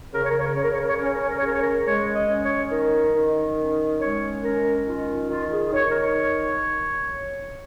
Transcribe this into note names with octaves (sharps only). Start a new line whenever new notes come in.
C#3 A#4
C#5
A#4
C#5
A#4
C#3 C#5
A#4
C#5
A#4
C#5
A#4
C#4 C#5
A#4
C#5
A#4
C#5
C#3 A#4
C#5
A#4
G#3 C#5
D#5
C#4
C#5
D#3 A#4
D#3
C#4
G#3 C#5
C#4 A#4
D#3 F4
D#3 F4
G#4
D#3 C#5
A#4
C#5